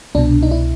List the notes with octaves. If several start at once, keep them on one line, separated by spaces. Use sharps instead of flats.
C2 B2 D4
D#4
E4